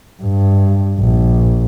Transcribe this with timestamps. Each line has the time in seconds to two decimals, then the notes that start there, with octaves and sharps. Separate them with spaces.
0.23 G2
1.00 A#1